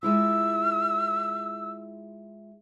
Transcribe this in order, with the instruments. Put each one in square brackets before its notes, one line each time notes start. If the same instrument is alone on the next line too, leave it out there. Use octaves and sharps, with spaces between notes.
[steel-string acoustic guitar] G#3 E4 F4 [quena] E6